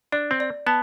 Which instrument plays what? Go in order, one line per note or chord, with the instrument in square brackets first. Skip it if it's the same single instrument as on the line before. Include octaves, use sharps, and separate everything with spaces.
[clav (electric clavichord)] D4 [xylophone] D5
[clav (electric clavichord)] C4
[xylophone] D5
[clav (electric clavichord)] B3 [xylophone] A5